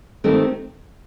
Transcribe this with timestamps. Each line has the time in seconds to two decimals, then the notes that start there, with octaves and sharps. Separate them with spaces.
0.24 D#3 A3 C4 G4 A#4